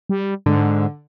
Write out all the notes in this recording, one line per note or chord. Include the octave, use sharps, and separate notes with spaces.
G3
G#2 D3